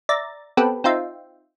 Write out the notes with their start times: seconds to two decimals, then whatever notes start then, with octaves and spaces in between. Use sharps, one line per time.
0.09 D5 E5 A#5 A6
0.57 B3 C4 G4 A4 B4
0.84 C4 D#4 F4 E5 G5